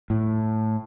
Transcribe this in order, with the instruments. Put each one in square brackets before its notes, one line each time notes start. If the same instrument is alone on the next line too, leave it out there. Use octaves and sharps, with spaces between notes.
[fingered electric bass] A2